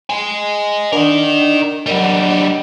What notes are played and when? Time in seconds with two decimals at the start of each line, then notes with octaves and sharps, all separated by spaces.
0.10 D#5 G#5
0.92 D4 A#4 D5 D#5 F#5
1.86 F#3 G3 A#4 D#5
2.04 D4 D#5 F#5